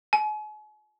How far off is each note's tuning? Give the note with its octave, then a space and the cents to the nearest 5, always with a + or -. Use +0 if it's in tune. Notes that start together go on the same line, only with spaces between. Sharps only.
G#5 +40